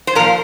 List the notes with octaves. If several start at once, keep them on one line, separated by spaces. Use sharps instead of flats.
C5
A#2 F3 A#4